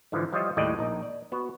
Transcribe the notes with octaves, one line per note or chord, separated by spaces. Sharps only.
G#2 D3 E3 F3
F3 G3 F4 C#5 D#5 E5
D#2 A2 G3 G#3 D5 D#5
A#1 D#4
D5
B3 F#4